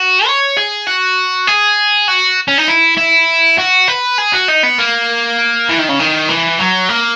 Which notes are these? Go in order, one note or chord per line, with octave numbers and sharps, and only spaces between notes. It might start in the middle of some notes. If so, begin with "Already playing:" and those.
Already playing: F#4
C#5
G#4
F#4
G#4
F#4
C#4
D#4
E4
E4
F#4
B4
G#4
F#4
D#4
B3
A#3
E3
D#3
C#3
D#3
E3
F#3
A#3